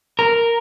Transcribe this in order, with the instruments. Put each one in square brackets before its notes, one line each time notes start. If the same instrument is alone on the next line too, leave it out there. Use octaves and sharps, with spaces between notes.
[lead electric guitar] A#4